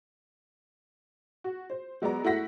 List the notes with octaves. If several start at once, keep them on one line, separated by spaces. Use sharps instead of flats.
F#4
C5
F#3 G#3 B3 D5 A#5
A3 E4 F#4 F#5 A#6 B6